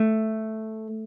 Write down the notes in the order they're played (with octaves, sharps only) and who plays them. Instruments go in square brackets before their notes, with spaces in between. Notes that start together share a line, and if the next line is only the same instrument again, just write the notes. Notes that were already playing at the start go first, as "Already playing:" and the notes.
Already playing: [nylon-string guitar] A3